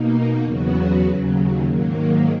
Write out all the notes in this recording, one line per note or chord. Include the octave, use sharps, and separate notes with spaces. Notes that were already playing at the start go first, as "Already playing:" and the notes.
Already playing: B2 A#3 D#4
E2 C#3 F#3 B3 F#4
D#2 C#3 F#3
G#2 D#3 F#3 A#3